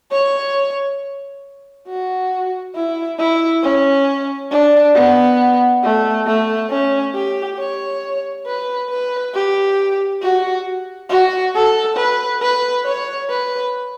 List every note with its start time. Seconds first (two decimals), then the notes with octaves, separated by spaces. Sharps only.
0.11 C#5
1.88 F#4
2.75 E4
3.18 E4
3.63 C#4
4.51 D4
4.94 B3
5.83 A3
6.26 A3
6.70 C#4
7.14 G4
7.58 C#5
8.46 B4
8.89 B4
9.34 G4
10.21 F#4
11.09 F#4
11.54 A4
11.97 B4
12.41 B4
12.85 C#5
13.29 B4